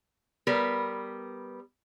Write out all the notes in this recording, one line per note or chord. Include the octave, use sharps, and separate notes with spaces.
G3 B3 A#4 B4